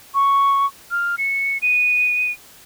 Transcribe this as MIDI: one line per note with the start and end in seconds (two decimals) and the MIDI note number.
0.14 0.66 85
0.91 1.15 89
1.18 1.58 97
1.62 2.31 99